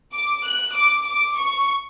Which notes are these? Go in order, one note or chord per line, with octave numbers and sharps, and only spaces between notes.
D6
F#6
D6
D6
C#6